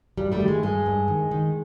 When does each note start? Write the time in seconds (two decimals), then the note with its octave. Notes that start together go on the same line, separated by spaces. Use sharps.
0.17 G2 G3
0.32 G3 A3
0.40 D#3
0.48 G#3
0.63 G2 G#3
0.86 G2
1.08 D#3
1.31 D#3